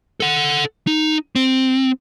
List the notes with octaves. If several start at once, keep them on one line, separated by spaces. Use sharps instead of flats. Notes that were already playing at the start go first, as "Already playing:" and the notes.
A4 F#5
D#4
C4